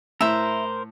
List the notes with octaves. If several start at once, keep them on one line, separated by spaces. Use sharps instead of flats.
A2 A#4 C5 E5 B5